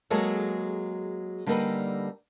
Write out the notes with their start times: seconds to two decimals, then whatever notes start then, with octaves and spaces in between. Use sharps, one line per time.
0.10 F#3 G#3 A#3 G#4 A4 C#5
1.46 D3 G3 A#3 D#4 A4 B4